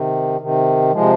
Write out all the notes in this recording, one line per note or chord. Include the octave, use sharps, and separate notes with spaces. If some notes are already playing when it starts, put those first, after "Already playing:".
Already playing: C3 D#3
C3 D#3
C3 F3 G#3